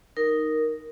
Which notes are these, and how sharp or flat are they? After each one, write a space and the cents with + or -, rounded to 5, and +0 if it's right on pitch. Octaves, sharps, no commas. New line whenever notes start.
D#4 +0 A#4 +0